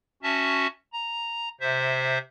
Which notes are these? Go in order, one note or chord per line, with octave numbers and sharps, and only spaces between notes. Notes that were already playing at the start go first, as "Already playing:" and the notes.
C#4 F#4 E5 A5
A#5
C3 C5 E5